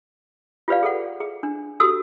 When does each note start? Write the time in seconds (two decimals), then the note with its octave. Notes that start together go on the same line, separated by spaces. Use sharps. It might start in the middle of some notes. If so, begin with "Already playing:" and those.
0.68 F4 G4 B4 D5 F5
0.83 G#4 A4 F#5
1.20 G#4
1.43 D4
1.80 F#4 G4 A4 D#6 E6